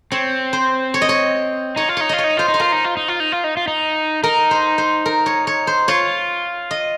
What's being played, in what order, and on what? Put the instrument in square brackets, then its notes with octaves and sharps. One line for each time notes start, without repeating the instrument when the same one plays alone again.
[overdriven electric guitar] C4 [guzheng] C#5
[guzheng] C5
C#5
D#5
C#5
[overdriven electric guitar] D#4 [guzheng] C#5
[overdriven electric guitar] F4
[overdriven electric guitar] D#4 [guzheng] C#5
[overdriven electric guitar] F4 [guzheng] D#5
[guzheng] C#5
[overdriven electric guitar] D#4
[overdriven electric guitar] F4 [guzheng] C5
[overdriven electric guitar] D#4
[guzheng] C5
[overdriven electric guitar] F4 [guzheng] A#4
[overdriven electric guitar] D#4
F4
D#4
F4
D#4
F4
D#4
F4
D#4
[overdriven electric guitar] D#4 [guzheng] A#4
[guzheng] C5
C5
A#4
C#5
C#5
C5
[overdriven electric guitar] F4 [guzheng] C#5
[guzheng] D#5